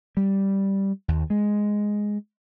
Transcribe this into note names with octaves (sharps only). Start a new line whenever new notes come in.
G3
D#2
G#3